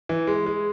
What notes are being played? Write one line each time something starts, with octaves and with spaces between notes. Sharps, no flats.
E3
G#3
G#3